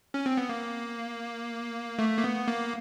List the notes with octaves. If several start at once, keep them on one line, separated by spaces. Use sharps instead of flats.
C#4
C4
B3
A#3
A3
A#3
B3
A#3